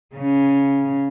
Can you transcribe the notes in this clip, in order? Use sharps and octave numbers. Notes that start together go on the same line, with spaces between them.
C#3